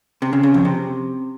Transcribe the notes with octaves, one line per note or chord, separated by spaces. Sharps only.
C3
C#3
C#3
F2
C3